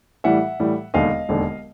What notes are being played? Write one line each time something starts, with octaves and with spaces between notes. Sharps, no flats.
A2 E3 G3 E5 F#5
A2 E3 G3
E1 D#2 D3 D#5 F5
E1 D#2 D3